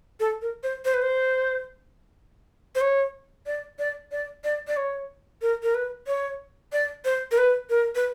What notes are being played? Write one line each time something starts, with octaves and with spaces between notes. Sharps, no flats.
A4
A#4
C5
C5
B4
C5
C5
C#5
D5
D5
D5
D5
D5
C#5
A#4
A#4
B4
C#5
D5
C5
A#4
B4
A#4
B4